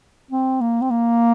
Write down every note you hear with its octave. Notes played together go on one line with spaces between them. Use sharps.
C4
A#3
C4
A#3